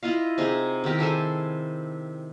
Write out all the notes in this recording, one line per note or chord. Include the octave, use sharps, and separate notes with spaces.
E4 F4 D#5 F5
C3 D#4 G#4
D#3 E4 G4 A#4
G#4 A4 C5 G#5